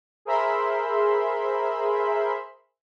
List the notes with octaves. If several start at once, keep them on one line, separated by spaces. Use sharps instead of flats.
G#4 A#4 C5 E5 B5 C6